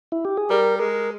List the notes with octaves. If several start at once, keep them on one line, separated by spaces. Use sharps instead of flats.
E4
G4
G#4
G3 A#4
G#3 A#4